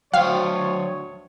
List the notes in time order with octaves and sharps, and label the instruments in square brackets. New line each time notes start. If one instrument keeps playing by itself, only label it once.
[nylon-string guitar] D2 G5 [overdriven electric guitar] F#3 C5 [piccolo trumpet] C#5 [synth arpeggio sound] F5